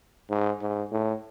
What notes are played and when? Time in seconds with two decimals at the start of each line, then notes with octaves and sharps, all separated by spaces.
0.30 G#2
0.61 G#2
0.92 A2